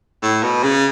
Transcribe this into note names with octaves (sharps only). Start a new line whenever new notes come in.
A2
B2
C#3